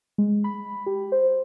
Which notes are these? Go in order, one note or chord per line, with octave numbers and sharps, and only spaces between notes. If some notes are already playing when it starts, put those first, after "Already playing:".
G#3
B5
G4
C5